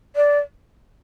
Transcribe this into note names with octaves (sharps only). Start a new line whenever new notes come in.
D5